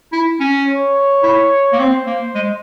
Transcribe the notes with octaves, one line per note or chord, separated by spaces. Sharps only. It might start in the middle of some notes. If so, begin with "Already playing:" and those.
E4
C#4
C#5
E4
A#3
C4 C5
A#3
G#3